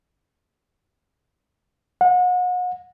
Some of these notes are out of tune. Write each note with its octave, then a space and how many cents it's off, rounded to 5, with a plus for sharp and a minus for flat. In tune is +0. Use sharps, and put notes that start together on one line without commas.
F#5 -35